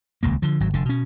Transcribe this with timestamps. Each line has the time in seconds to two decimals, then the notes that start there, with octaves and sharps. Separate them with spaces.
0.23 D#1 C#2 A#2 A#3
0.42 D3 F3
0.60 G#1 F#3
0.74 F1 D3
0.85 B2 C#4